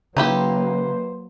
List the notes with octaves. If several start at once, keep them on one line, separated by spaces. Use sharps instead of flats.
C#3 F#3 A#3 D#4 E4 G4 B4 C5